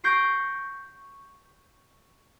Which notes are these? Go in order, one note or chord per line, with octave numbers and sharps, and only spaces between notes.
C#6 G6 A#6 C7 D7